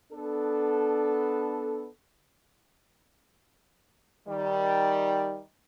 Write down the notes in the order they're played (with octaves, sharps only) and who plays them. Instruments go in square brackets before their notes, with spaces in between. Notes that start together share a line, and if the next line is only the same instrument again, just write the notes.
[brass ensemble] B3 D4 A4
[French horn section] D#3 G3